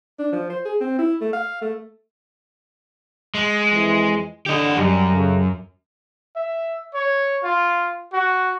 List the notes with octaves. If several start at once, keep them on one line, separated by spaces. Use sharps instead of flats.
D4
F3
C5
G#4
C4
E4
A3
F5
A3
G#3
F2 E3
D3 G4 D#5
F#2 G3
C#3 G4 A4
E5
C#5
F4
F#4